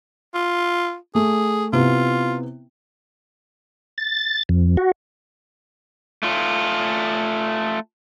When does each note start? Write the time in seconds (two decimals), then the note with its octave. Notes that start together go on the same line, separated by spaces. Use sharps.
0.34 F4
1.15 A3 G#4
1.73 C3 B3 E4 F4
3.98 A6
4.49 F2
4.77 F#4
6.23 A3 F4